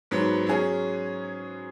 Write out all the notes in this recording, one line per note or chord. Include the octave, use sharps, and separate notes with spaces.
G#2 F#3 B3
F#3 C#4 G#4